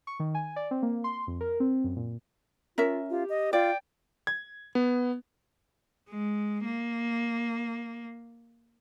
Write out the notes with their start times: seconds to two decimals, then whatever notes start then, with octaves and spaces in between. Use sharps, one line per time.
0.07 C#6
0.20 D#3
0.35 G#5
0.56 D5
0.71 C4
0.83 A#3
1.04 C6
1.27 F2
1.41 A#4
1.60 C4
1.84 F#2
1.97 A#2
2.78 C#4 F4 A#4 E5
3.10 F4 G4
3.29 D#5
3.53 F4 D5 G5
4.27 G#6
4.75 B3
6.08 G#3
6.65 A#3